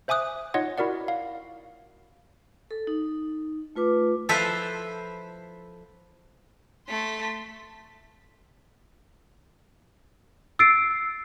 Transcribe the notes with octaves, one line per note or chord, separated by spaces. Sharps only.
C5 E5 G#5 D6 D#6 F#6
D#4 F4 C#5 D#5 F#5 C6
E4 F#4 A#4 D5 F#5
F5
A4
D#4
A3 F4 B4 D6
F3 E4 A4 B4 C5 E5
A3 C6 B6
E6 A6 C7 D7